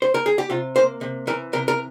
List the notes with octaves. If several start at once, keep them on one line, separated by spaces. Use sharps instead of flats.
C5
A#4
G#4
G4
C3 F4
A#3 C5
C3
E3 A#4
C3 A#4
A#4